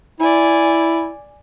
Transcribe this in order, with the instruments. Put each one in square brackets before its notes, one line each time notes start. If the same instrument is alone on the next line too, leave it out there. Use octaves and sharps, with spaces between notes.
[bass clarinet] E4 [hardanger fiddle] D5 G#5